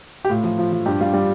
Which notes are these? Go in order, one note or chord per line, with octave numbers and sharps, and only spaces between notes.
G4
A2 F4
F3
F3
F3
G2 G4
G3 F4
G3